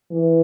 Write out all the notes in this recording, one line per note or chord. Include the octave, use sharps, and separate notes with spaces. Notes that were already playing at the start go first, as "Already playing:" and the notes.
E3